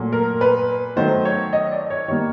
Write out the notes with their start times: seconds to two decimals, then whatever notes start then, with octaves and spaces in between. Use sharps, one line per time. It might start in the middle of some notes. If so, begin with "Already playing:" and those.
Already playing: A#2 F#3 A3
0.13 A#4
0.41 B4
0.96 D#3 F#3 A3 C5
1.25 C#5
1.53 D#5
1.72 D5
1.90 C#5
2.08 D#3 G3 A#3 C#5